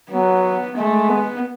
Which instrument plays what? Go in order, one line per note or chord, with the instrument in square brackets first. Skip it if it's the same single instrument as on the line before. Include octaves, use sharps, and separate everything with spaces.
[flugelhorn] F#3 [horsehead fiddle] B3
[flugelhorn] G#3 [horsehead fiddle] A3
[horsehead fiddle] B3